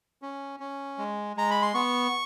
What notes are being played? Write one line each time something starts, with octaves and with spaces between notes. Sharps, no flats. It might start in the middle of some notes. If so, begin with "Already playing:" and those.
C#4
C#4
G#3
G#3 A#5
B5
C6
B3 C#6